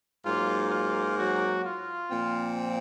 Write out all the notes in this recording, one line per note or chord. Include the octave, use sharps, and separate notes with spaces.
G#2 F#3 A#3 F4
F4
F#3 F#4
F4
A#2 F3 C4